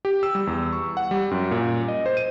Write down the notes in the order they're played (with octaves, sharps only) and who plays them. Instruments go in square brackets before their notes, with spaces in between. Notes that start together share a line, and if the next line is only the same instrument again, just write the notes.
[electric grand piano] G4
E6
G3
E2
C#6
F#5
G3
F#2
A#2
D#5
C5
D#7